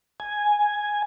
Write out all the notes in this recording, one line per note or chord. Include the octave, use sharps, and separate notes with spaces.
G#5